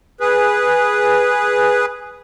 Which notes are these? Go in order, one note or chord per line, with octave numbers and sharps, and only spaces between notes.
G#4 B4